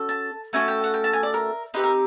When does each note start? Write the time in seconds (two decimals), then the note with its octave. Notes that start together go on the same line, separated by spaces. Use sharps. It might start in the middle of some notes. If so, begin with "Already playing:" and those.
Already playing: C#4 F#4 A4
0.09 A5
0.53 A3 C#4 F#4 A4 G#5
0.68 G5
0.84 F#5
0.94 G5
1.04 A5
1.13 G#5
1.23 D5
1.34 A#4
1.74 C4 D#4 G4 B4
1.84 A#4